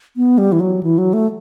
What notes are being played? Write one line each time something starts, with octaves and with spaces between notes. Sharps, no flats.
B3
G3
E3
F#3
E3
F#3
A3